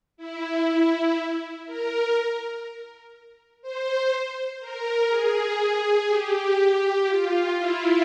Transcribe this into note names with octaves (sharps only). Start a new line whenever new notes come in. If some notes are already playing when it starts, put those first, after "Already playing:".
E4
A#4
C5
A#4
G#4
G4
F4
E4